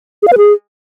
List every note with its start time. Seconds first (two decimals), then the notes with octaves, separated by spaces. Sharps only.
0.23 G#4
0.28 F5
0.33 B4
0.38 G#4